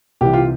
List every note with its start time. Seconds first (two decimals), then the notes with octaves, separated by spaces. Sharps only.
0.21 C2 C3 E3 G4
0.33 F4